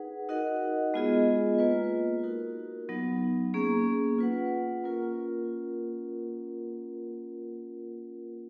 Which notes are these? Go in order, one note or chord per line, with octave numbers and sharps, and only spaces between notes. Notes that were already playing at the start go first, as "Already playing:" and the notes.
Already playing: D#4 G#4 B4 F#5
D#4 F#4 A#4 D#5 F#5
G#3 B3 F4 G#4 D#5
A#3 F4 B4
D#4 F#4 A#4
F#3 B3 D#4
A#3 C#4 G#4
F4 B4 F#5
A#3 C#4 F4 A#4